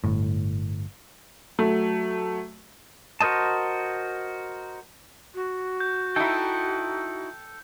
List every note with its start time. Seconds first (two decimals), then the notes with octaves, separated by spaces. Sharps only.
0.04 G1 A2
1.59 F#3 A3
3.20 F#4 A#4 C5 D#5 A5
5.35 F#4
5.80 G6
6.16 D#4 E4 A4 G5